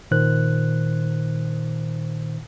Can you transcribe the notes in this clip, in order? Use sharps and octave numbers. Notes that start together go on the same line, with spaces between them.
A#2 D#3 C5 F#6